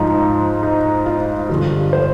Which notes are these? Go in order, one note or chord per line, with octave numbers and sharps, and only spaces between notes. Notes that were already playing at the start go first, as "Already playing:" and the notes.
Already playing: G#2 F3 D#4
D#4
F4
G2 D3 F3
C5